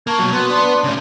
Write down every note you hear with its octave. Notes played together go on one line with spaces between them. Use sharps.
A#3 A5 C#6 G#6
B2 F#3
B3 F#4 C6
D4 B4 C6
A2 C#3